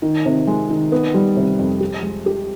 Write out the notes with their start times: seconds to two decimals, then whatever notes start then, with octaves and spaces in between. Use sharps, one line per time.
0.02 D#3
0.26 C3
0.47 G#3
0.70 D#3
0.92 B3
1.14 G3
1.37 C3
1.59 F2
1.80 G4
2.03 G#3
2.26 G4